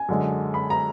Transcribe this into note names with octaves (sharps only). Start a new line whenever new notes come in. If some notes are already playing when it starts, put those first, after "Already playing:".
Already playing: G#5
F#2 D3 G#3
B5
A#5